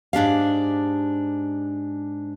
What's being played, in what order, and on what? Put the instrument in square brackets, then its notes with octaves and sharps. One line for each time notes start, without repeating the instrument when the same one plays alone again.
[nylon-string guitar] G#2 D4 G4 F5